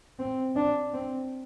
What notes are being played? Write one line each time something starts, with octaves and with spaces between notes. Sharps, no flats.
C4
D4
C4